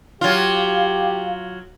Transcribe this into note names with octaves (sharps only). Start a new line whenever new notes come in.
F#3 F4 G4 F5